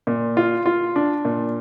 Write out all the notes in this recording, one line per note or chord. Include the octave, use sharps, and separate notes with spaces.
A#2
F4
F4
D4
A#2